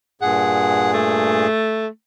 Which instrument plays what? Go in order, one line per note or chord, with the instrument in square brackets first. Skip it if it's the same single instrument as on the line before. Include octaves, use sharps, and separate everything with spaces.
[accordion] G2 A#2 G#4 [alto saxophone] F#5
[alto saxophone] A3